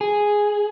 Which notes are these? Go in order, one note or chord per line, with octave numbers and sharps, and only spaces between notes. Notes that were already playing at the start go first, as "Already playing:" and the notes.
G#4